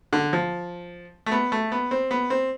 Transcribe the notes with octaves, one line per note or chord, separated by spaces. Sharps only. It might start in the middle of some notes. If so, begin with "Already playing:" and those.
D3
F3
A3
B3
A3
B3
C4
B3
C4